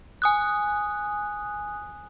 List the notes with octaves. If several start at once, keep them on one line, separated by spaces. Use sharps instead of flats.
G#5 D#6 F#6